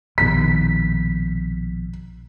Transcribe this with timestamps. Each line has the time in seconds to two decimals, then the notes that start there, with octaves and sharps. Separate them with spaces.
0.18 A#1 B2 D#3 B6